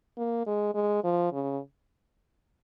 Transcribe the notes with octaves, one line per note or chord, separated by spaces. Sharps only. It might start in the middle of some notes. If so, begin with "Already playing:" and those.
A#3
G#3
G#3
F3
C#3